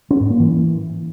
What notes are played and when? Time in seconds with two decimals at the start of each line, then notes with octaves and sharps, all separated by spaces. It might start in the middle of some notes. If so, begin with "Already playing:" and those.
0.11 C#4
0.20 G#2
0.30 A#3
0.40 E3